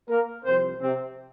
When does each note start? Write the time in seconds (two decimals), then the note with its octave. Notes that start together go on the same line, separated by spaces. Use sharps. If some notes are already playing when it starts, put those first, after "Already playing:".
0.08 A#3 A#4
0.45 C2 C3 F3 C4 C5
0.81 C3 C4